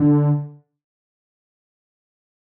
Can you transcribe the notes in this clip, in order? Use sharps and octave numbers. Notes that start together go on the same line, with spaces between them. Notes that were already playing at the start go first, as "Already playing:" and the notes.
Already playing: D3